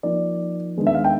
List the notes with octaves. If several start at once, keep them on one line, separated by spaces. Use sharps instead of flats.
F3 A#3 D#4 D5
D#3 G#3 B3 D4
E5
F5
G5